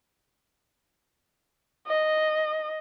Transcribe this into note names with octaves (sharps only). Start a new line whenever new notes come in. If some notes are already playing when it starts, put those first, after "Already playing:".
D#5